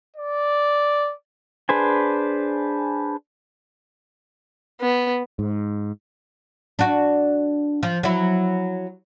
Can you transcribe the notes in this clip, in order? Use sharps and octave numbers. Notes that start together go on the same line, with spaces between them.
D5
D4 G#4 B4 C5 G#5
B3
G#2
D4 F#4
F3
F#3 E4